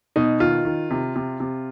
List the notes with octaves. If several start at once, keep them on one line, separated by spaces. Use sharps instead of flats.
B2 D#4
D#3 F4
D#3
C3
C3
C3